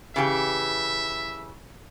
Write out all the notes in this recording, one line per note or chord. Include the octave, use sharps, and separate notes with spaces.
C#3 E3 G4 E5